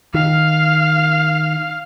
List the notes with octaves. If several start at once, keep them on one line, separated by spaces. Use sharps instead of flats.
D#3 F5